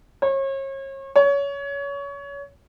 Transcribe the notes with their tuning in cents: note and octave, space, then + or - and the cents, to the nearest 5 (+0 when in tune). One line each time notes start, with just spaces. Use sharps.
C#5 -35
C#5 +25